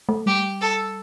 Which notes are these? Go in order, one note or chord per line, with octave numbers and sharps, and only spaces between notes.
A3
G3 G4
A4